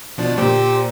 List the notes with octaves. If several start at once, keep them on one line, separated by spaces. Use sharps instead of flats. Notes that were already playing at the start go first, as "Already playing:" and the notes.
B2 F3 D4
A#2 G4 C5